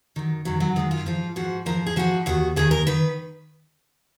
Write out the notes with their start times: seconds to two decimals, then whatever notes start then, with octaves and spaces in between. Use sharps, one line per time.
0.16 F#2 D#3
0.45 F#2 D#3 F#3
0.60 F#3
0.76 F#2 D#3 G#3
0.91 F4
1.06 G#2 F3 F4
1.36 G#2 F3 F#4
1.66 G#2 F3 A#4
1.86 G#4
1.96 G#2 F3 F#4
2.26 D#2 D#3 F#4
2.56 D#2 D#3 G#4
2.71 A#4
2.87 D#3 B4